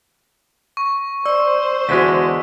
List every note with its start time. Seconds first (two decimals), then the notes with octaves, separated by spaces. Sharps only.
0.77 C#6
1.26 C5 D5 E6
1.89 E2 D3 G#3 F#4 B6